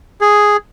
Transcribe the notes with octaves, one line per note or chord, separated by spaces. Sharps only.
G#4